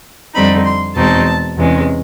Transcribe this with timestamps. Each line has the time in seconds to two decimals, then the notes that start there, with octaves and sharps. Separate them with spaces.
0.34 F2 D3 G3 C4 D#4 B5
0.65 C6
0.95 E2 B2 G#3 C4 D#4 A5
1.57 E2 C3 E3 G#3 C#4